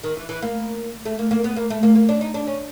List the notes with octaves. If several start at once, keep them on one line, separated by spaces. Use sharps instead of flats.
D#3
E3
E3
A#3
A3
A#3
A#3
B3
A#3
A3
A#3
A#3
D4
D#4
D4
C#4